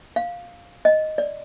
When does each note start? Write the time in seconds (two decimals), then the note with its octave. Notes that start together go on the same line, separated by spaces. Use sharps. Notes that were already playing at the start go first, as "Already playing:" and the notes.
0.16 F5
0.85 D#5
1.18 D5